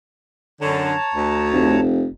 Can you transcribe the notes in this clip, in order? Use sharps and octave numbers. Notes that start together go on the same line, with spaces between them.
F#2 D3 C#5 A5 A#5
D2
F1